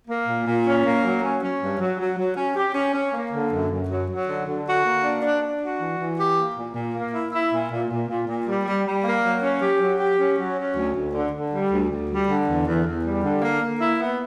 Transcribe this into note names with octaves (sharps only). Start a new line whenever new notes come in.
A#3
A#2
A#2
C#4
A#3
F#3
C#4
C#4
G2
F#3
F#3
F#3
C#4
G4
C#4
C#4
A#3
D3
F#2
F#2
F#3
F#3
D3
D3
F#4
A#3
D4
D4
D4
F#4
E3
E3
G4
A#3
A#2
A#2
A#3
E4
E4
A#2
A#2
A#2
A#2
A#2
G3
G3
G3
A#3
F#3
C#4
G4
F#3
G4
C#4
F#3
C#4
D2
D2
D3
D3
G3
D2
D2
G3
D3
E2
E2
E2
G3
D3
A#3
A#3
E4
B3